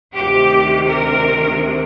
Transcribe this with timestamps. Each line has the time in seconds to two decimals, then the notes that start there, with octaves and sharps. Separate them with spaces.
0.14 D2 C3 D#3 G4
0.86 A#4